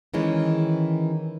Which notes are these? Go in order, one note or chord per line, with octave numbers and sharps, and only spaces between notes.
D#3 E3 G#3 C#4